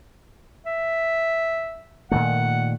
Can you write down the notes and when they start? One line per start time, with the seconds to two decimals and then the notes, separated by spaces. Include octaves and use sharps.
0.66 E5
2.12 A#2 D#3 A3 F#5